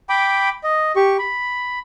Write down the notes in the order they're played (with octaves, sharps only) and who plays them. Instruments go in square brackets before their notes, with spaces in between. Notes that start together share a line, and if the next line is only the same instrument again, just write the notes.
[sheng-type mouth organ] G5 B5 D6
D#5
G4 C#6
B5